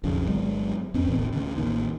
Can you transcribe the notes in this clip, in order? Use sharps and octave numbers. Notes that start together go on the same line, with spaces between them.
B1 F2 C#3
G1 F#3 G#3
E2 C4 C#4
D1 A1 E2
D2 C#3
A1 D#2